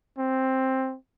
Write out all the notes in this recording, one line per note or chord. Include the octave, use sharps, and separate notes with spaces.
C4